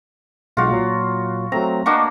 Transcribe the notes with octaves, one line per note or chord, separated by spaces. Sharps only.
B1 G#3 F4 F#4 F5
A#2 F#3
F#3 A3 C4 A#5
A#3 D4 F#4 D#5 C#6